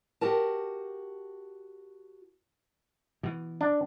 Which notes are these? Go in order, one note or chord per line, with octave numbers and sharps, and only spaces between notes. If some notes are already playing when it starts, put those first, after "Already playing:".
F#4 G4 A#4 A5
B2 E3
D4